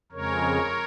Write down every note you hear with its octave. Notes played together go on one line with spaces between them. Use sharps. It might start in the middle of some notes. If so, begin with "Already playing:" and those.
F2 C#3 G#3 A#4 C#5